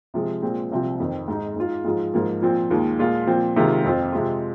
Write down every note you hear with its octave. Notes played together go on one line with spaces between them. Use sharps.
C3 F3 G#3
A#2 G#3 C4
C2 C3 F3 C4 F4
F2 D#3 C4
G#2 G#3 D#4
G#2 G#3 F4
G#2 F3 G#3 F4
G#2 F3 A#3
A#2 F3 C4
D#2 D#3 G#3 F4
A#2 G#3 F4
A#2 F3 C4
C3 D#3 G#3 F4
F2 F3 C4 F4
C3 G#3 F4